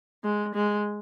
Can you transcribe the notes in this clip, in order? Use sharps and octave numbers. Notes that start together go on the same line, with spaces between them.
G#3
G#3